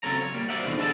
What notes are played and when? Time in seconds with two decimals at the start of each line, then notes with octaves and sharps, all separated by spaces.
0.03 C#3 F#3 C4 A4 C#5 A#5
0.21 C#5
0.34 G3 A#3
0.49 F#4 G4 C5 D5 E5 F#5
0.65 D#2 B2 D3 E3 D#4 C5
0.78 D4 G#4 A4 D5 A5